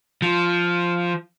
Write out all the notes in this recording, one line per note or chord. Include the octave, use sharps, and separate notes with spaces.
F3